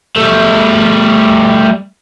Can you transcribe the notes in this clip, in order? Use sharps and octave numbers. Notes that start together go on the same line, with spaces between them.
G3 A3